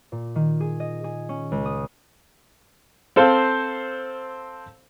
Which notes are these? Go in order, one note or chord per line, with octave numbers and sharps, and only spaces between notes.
A#2
D#3
G#4
D#5
G#4
C#4
C#2
D#6
C4 A4 C5 F5